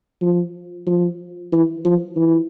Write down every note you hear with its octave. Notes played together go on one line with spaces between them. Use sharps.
F3
F3
E3
F3
E3